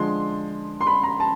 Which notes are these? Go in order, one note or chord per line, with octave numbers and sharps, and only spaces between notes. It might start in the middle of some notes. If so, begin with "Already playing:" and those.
Already playing: D3 F3 G#3 C6
C6
B5
A#5
A5